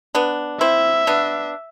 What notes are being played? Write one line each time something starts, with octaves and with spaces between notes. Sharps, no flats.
B3 D4
C4 E4 E5
B3 D4